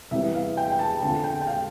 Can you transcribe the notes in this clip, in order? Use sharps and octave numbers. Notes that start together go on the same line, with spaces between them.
C3 E3 G3 B3 E5
F5
G5
G5
A5
D3 A3 C4 F4 A5
G5
G5
F5